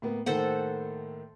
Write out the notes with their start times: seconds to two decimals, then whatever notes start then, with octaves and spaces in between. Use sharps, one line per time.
0.02 A2 A#3 B3
0.26 A2 D#3 A#3 A4 C5 F#5